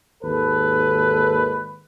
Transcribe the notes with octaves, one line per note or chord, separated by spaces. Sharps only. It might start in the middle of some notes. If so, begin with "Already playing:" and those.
G#1 D#2 A4 B4